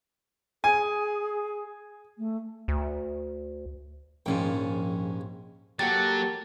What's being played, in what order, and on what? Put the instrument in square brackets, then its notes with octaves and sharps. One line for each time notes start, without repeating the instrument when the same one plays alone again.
[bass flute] G#4 [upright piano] G#5
[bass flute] A3
[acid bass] D2
[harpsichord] A#1 D#2 G#2 [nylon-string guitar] F3 C#4 G5
[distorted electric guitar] F#3 [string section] A#3 [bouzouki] G4 A4 F#5 [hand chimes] A6